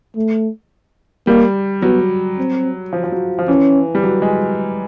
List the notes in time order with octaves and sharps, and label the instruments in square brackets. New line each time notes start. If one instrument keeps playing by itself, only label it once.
[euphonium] A3
[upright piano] G3 [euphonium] A#3
[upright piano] F#3 [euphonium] B3
[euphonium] C4
[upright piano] F3
F3
F#3
F3
[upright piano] E3 [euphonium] C#4
[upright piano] G3
F#3
G#3